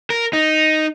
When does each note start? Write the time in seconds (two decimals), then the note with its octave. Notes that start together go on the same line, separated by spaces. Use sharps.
0.10 A#4
0.33 D#4